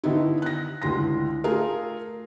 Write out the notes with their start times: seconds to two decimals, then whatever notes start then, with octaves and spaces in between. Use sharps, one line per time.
0.04 D3 D#3 B3 D#4 E4
0.42 F#6 A#6
0.82 C#2 A2 D3 C6 A#6
1.44 A3 F4 G#4 A#4